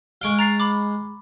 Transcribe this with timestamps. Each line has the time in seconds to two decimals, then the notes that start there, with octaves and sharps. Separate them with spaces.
0.21 G#3 F5 C#6 D7 G7
0.39 A#5 A6 C7
0.60 B5 D6